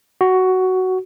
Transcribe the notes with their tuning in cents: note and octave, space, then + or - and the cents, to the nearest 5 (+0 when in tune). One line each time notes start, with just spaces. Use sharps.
F#4 +10